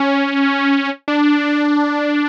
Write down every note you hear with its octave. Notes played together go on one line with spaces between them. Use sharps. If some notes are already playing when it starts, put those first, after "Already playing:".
Already playing: C#4
D4